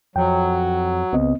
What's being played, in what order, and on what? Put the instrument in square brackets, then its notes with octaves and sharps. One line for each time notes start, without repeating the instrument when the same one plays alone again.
[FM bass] F2 [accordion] F#3 [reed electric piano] G5
[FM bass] C#2 [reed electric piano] B3 C4 D#5